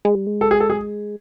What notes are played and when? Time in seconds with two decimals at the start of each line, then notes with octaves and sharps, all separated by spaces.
0.05 G#3
0.15 G3
0.27 G#3
0.41 A4
0.51 G#4
0.60 A4
0.70 G#4